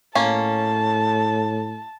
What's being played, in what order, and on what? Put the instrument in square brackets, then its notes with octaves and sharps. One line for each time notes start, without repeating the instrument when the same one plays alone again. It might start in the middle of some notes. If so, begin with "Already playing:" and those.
[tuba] A2 [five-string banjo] A#3 C#4 [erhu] A5